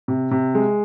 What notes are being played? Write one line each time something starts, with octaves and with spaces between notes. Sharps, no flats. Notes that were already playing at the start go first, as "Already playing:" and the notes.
C3
C3
G#3